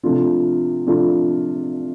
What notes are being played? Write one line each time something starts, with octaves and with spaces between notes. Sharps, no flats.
C3 F3 A3 D4 F4
C3 F3 A3 D4 F4